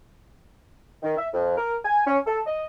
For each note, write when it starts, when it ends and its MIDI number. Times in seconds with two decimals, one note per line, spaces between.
1.03 1.16 51
1.18 1.28 76
1.34 1.57 41
1.58 1.76 70
1.85 2.03 80
2.07 2.19 61
2.26 2.39 69
2.46 2.65 75